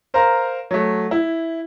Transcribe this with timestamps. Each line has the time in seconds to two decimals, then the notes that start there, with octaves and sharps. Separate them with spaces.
0.14 A#4 C5 F5 A#5
0.71 F#3 A3
1.11 E4